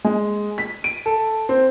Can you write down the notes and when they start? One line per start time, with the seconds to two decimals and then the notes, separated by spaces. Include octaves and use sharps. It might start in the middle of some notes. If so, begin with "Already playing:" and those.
0.04 G#3
0.58 B6
0.84 D7
1.06 A4
1.49 C4